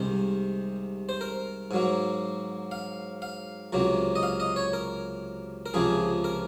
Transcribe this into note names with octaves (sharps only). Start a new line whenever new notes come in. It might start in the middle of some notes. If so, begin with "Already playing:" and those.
Already playing: C2 C3 D#3 G#3 C5
C5
A#4
G#2 F#3 A#3
F5
F5
C#2 C3 F#3 A#3
D#5
F5
D#5
C#5
A#4
A#4
C#2 C3 F3 A#3 G#4
A#4